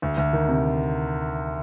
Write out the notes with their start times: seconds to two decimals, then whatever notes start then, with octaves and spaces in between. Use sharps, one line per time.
0.02 D2
0.17 D2
0.33 D#3
0.48 C3